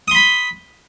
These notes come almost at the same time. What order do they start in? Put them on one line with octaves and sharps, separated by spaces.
D#6 C6 B5